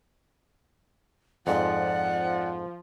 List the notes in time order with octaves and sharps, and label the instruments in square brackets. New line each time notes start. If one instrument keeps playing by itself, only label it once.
[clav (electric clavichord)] F2 G#2 [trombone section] F3 [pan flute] D5 [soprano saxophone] F#5